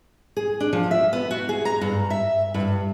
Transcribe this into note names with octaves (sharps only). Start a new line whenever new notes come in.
G#4
D4
F3
E5
B3
F#4
G#4
A#5
G2
E5
G2